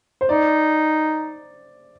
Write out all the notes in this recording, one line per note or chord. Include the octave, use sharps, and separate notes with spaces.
C5
D#4 D5